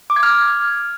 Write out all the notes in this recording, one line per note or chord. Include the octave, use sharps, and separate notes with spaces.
D6
G#6
F6